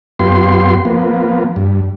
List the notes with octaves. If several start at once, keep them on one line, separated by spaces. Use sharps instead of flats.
F#2 B3 F4 G4 C6
F3 A#3 B3
G2